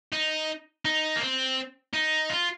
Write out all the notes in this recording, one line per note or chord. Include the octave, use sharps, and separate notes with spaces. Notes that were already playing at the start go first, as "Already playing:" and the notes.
D#4
D#4
A#3
C4
D#4
F4